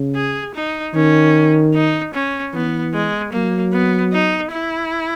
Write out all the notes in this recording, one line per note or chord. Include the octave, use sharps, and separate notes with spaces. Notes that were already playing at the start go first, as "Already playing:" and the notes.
Already playing: C#3
G#4
D#4
D#3 C#4
D#4
C#4
E3 B3
G#3
F#3 A#3
B3
D#4
E4